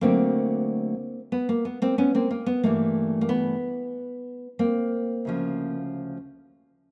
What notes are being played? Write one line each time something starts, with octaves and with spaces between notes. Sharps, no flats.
D2 D3 F#3 A3 A#3 C4
B3
A#3
B3
A#3 C4
B3 C#4
A#3 C4
A#3
B3
G2 E3 A3 A#3
A#3
B3
A#3 C4
D2 C#3 F3